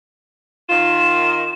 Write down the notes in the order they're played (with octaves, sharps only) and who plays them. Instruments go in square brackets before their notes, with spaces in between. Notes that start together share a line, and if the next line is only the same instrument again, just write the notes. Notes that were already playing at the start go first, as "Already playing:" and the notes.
[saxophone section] D#3 F4 [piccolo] E7